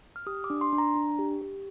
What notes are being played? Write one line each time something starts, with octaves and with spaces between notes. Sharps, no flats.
F6
G4 D#6
D6
D4
C6
D4
A#5
D4
G4
G4